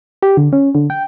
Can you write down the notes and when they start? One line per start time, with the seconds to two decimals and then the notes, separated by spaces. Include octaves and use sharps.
0.23 G4
0.37 D3
0.53 C#4
0.75 D3
0.90 G5